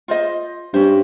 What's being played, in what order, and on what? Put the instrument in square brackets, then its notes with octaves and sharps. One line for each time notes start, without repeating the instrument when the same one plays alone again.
[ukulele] F4 C5 D#5
[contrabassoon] G2 [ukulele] C#4 C5